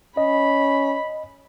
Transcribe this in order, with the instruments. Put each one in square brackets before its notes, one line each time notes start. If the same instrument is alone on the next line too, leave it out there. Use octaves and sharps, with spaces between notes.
[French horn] C#4 [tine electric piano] D#5 [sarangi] B5